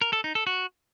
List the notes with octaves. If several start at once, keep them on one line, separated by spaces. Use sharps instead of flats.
A#4
A4
D#4
A4
F#4